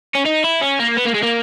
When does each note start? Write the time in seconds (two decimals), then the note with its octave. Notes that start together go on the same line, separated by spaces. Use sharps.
0.15 C#4
0.26 D#4
0.44 E4
0.61 C#4
0.79 A#3
0.97 B3
1.06 A#3
1.15 G#3
1.23 A#3